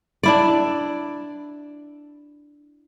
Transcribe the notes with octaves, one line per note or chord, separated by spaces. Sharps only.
D4 E4 D5